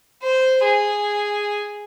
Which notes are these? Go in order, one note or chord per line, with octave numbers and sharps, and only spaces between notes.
C5
G#4